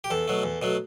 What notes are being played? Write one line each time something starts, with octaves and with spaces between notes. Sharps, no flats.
G4
E2 A4
B2 F#3 A3
E2
B2 F#3 A3